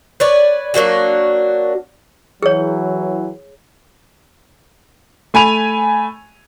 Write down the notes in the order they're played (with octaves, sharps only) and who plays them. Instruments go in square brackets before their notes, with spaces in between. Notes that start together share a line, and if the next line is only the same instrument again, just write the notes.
[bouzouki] B4 C#5 D5
F#3 A#3 D4 F#4
[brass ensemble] E3 F#3 [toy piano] G#4 C#5
[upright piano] A3 G#5 B5 D#7 F7